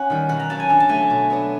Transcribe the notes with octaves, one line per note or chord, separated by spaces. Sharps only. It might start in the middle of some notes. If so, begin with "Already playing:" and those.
Already playing: C#4 F#5
D#3 G3
B2 F#5
A#5
F#3 A#3 C#4 A5
G#5
D3 A5
A5
F#3 A3 G#5
B2
F#3 B3 D4